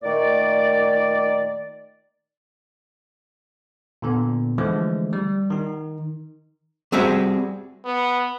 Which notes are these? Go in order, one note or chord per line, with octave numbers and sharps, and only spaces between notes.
A#2 D#3 A3 D5
A#2 D3 B3
D3 E3 F3 G#3 A3
G3
D#3 D#4
G3 C4 F#4 G#4 E5
B3